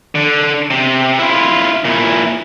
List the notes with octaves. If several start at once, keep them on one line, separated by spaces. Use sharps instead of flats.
D3
C3
E4 F4
A#2 E4